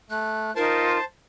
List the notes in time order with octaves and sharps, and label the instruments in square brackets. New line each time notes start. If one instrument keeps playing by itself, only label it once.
[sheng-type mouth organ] A3 [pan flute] F#6
[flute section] D#4 F4 [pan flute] A#4 [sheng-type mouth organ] C5 A5